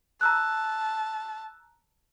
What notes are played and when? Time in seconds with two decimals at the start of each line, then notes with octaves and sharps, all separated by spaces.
0.21 A5 A#5 E6 F#6